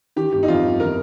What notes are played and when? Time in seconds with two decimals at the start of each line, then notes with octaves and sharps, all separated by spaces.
0.16 D#3 G4
0.33 G1 G4
0.43 D#4
0.48 F2 F4
0.64 G1
0.80 D#3 A#4